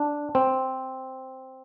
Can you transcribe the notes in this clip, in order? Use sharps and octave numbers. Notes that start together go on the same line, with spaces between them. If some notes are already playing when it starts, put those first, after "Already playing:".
Already playing: D4
C4